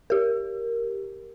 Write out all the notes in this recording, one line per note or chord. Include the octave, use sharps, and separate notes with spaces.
G4 A#4